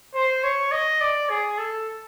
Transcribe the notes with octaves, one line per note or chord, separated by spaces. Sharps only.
C5
C#5
D#5
D5
G#4
A4